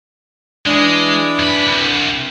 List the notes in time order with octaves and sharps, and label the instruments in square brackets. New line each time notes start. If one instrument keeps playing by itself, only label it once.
[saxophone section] E3 D4 [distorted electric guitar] G#3
[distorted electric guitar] F#2 B5
C2